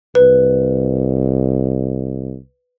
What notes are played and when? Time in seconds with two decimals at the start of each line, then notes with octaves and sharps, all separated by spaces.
0.15 C2 B4